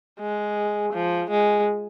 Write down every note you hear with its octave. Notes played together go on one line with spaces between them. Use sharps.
G#3
F3
G#3